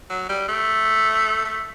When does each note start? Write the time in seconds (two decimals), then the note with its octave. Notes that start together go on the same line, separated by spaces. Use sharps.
0.10 F#3
0.29 G3
0.48 A3
1.45 A3